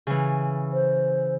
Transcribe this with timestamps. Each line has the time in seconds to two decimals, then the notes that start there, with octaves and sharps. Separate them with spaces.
0.07 C#3 E3
0.73 C5